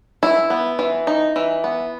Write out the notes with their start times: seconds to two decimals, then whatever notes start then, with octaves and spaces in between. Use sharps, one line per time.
0.23 E3 E4
0.50 B3
0.79 E3
1.07 D#4
1.36 E3
1.64 B3